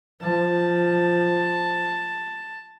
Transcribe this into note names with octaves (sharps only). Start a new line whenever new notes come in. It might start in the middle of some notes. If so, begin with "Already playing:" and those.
F3 A5